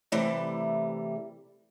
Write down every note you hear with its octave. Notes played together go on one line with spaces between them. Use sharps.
C3 E3 G3 A3